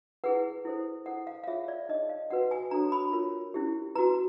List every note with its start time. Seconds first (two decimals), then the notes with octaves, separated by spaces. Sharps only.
0.24 E4 G#4 B4 F#5
0.65 E4 A4 C5
1.06 E4 A4 C5 F#5
1.27 F5
1.44 F5
1.47 F4 G#4 C#5 E5
1.68 D5
1.89 D#4 G#4 C#5 D#5
2.09 F5
2.30 D#4 F#4 B4 F#5
2.51 G#5
2.71 D4 F#4 A4 C#5 A#5
2.92 B5
3.13 F4 A#4 C#5
3.54 C#4 E4 G4
3.95 F#4 B4 A#5